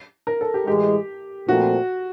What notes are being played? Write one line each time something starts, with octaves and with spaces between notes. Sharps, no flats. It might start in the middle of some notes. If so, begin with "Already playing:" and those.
A#4
A4
G4
A2 E3 G#3 G4
A#2 F3 A3 C4 F#4